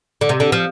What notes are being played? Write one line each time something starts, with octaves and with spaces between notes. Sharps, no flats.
D3
C3
D3
F3